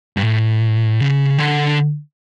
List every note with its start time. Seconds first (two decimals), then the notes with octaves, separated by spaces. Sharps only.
0.17 G2
0.23 A2
1.00 C#3
1.38 D3